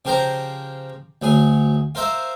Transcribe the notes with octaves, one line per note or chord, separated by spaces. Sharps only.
C#3 F3 G4 A#4 C5 A#5
D2 F#3 G#4
F4 A#4 C5 E5